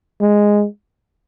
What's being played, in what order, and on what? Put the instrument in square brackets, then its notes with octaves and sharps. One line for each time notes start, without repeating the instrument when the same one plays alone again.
[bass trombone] G#3